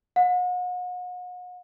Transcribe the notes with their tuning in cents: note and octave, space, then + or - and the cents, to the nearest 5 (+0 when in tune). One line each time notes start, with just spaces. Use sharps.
F#5 -40